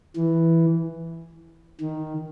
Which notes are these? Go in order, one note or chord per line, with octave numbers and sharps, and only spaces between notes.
E3
D#3